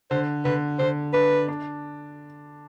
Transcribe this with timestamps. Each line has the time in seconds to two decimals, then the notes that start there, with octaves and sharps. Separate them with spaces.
0.11 D3 C5
0.45 D3 B4
0.79 D3 C5
1.13 D4 B4
1.48 D4